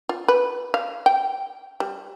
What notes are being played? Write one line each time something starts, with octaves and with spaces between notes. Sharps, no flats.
F4
B4
F5
G5
G3